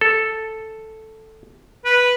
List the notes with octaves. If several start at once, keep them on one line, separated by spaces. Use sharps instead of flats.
A4
B4